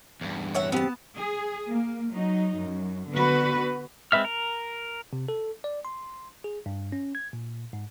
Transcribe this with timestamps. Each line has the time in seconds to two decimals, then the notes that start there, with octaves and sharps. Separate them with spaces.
0.21 E2 G2
0.55 C#5 E5 F#5
0.72 B3 C4 G4 A5
1.16 G#4
1.70 A#3
2.13 F#3 D#4
2.58 F#2
3.11 D3 B3 F#4 B4
4.12 G#3 C4 B4 E5 F6
4.25 A#4
5.13 C3
5.28 A4
5.64 D5
5.85 C6
6.44 G#4
6.66 G2
6.92 C#4
7.15 G#6
7.33 A#2
7.73 G#2